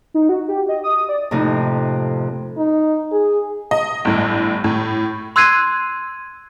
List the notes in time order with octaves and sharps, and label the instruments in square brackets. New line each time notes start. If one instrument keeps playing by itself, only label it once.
[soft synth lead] D#4
F#4
G4
D#5
D#6
D5
[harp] F2 A2 C3 D#4
[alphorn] D#4
G#4
[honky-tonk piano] D#5
G1 A2
A2
[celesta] C6 E6 F#6 G#6 C7 D#7